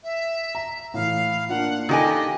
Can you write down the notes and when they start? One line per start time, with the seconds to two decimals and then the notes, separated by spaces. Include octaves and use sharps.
0.04 E5
0.55 A#5
0.94 A2 E3 F5
1.49 A#3 D4 F4 F#5
1.89 D#3 F4 G4 A4 D#5 G#5